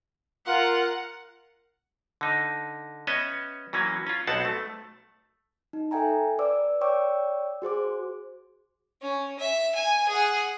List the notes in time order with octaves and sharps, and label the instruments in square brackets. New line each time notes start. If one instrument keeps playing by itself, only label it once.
[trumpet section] F4 A#4 [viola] F#5
[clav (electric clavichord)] D3 D#4
B3 C#4 C#5 D#5 E5
E3 F#3 A#3 C#4
C#4 F4
B1 B3 C4 C5 F#5 A5
A3
[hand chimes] D#4
A4 E5 G5 G#5 A#5
B4 D5 D6 E6
C#5 D5 G5 C#6 D6 E6
F#4 G#4 C5 D6
[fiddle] C#4
E5
G#5
G#4 F#5